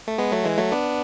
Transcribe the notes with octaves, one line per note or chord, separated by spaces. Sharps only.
A3
G#3 B3
F#3 A3
E3 G#3
F#3 A3
B3 D4